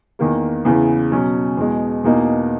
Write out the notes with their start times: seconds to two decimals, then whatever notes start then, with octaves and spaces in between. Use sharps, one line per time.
0.19 E2 D#3 A#3
0.65 E2 C#3 E3
1.11 B2 F#3 C#4
1.57 E2 B2 G#3
2.04 E2 B2 A#3 D#4